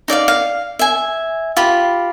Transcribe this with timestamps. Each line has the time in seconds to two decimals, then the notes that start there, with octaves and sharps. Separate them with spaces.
0.08 D#4 D5 E5 F5
0.28 F5
0.79 E5 G#5
1.57 F4 G4 B5